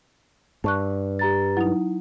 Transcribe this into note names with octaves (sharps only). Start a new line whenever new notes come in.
G2 A5 C#6 F#6
G4 A#5 A6
F#3 D#4 E4